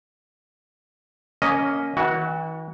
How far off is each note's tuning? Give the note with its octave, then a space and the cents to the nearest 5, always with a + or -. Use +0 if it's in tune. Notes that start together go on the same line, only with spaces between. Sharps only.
A#3 +0 C#4 +10 D#5 +0
E3 -40 F#4 +5